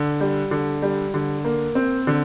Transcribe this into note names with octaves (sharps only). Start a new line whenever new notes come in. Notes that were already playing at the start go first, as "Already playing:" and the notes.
Already playing: D3
G3
D3
G3
D3
A#3
C4
D3